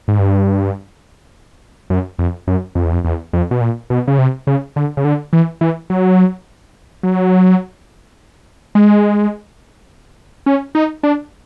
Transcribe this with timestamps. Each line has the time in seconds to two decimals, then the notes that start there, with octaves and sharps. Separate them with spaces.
0.08 G#2
0.19 G2
1.90 F#2
2.19 F2
2.47 F#2
2.75 F2
2.85 E2
2.93 F2
3.05 E2
3.33 F2
3.51 B2
3.61 A#2
3.90 B2
4.08 C#3
4.18 C3
4.47 C#3
4.76 D3
4.97 C#3
5.05 D3
5.33 E3
5.61 E3
5.90 F#3
7.03 F#3
8.75 G#3
10.46 C#4
10.75 D#4
11.03 D4